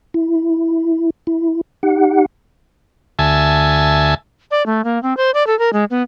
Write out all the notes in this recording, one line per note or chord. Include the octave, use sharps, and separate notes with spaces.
E4
E4
D#4 G4 F#5
D2 E5 G#5 A5
D5
A3
A#3
C4
C5
D5
A4
A#4
G#3
B3